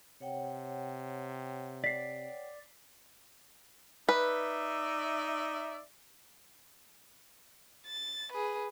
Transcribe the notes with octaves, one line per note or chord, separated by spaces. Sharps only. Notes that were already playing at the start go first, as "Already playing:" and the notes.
C3 C#5 F#5 G5
D5 B6 C7
D#4 B4 D5 E5
A6
G#4 B4